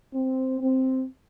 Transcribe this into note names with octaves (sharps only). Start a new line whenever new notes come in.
C4
C4